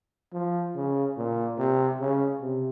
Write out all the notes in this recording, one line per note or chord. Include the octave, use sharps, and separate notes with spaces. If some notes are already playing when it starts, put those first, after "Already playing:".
F3
C#3
A#2
C3
C#3
C3